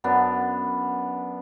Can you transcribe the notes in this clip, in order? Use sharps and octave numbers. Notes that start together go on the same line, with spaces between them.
F#2 B3 D4